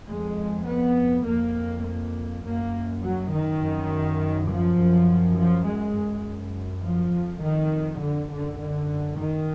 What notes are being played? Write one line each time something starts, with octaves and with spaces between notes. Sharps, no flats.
F2 G#3
B3
F2 A#3
A#3
F#2 A#3
F#3
D#3
F#2
F3
F#2
F3
G#3
F#2
F3
F2
D#3
D3
F#2 D3
D3
D#3